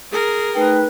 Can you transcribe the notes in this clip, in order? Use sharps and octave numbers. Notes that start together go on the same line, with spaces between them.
G#4 A#4
A3 D#4 B4 G5